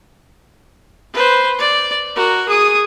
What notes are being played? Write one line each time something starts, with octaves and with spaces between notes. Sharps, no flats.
B4 C5
D5
F#4 A#4
G#4 D#6